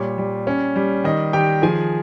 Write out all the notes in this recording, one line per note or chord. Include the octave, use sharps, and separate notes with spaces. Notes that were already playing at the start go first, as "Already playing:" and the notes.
Already playing: A#2 G3 C#5
G3
C#4
G3
D#3 D#5
D#3 G4 G5
F3 G#4 G#5